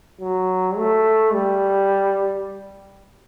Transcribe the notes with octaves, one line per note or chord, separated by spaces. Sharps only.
F#3
A3
G3